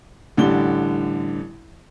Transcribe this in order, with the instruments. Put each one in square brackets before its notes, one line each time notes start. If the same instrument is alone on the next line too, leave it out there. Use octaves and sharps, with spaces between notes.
[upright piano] A1 D3 G3 G7